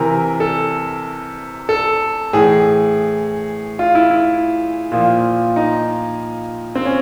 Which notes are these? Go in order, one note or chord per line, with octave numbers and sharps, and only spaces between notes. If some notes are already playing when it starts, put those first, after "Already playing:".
Already playing: C3 E3 A#4
A4
A4
A2 E3 G#4
F4
E4
E4
A#2 F3
D#4
C4
C#4